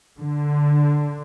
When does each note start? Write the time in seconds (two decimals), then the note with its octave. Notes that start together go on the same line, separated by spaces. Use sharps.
0.18 D3